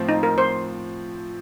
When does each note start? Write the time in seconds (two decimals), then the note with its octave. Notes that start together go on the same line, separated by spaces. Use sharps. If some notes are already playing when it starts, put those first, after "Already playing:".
Already playing: A2 F3 C4
0.09 D#4
0.23 A#4
0.38 C5